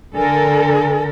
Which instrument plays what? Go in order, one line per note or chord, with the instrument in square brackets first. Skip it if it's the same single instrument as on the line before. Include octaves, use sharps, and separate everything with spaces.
[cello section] D3 A4 A#4 [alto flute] G#5